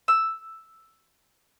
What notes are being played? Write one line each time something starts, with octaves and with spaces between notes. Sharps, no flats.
E6